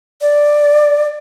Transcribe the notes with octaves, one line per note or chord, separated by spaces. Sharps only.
D5